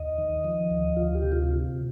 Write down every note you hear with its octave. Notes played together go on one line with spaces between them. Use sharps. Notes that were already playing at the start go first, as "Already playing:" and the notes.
Already playing: D#2 D#5
D#3
F3
D2
D2 F4
G4
C3
F4